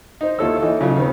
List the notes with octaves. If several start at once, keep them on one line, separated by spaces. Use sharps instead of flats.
D#4 C5
D#2 E4 F4 A4 C#5 E6
E3 D#4 E4 A4
A#2 C#3 F#3
D#3 B3 C4